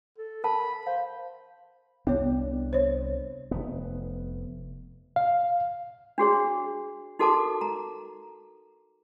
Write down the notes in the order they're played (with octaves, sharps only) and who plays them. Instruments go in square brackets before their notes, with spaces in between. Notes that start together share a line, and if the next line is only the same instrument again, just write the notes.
[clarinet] A4
[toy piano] A#4 A5 [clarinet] B5
[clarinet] C5 [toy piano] F5
[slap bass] C2 D4 [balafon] B3 C#5
[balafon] C5 C#5
[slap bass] F1 B3
[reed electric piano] F5
[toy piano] D4 F#4 G#4 C#5
D#4 F#4 A4 A#4 A5 D6
A#5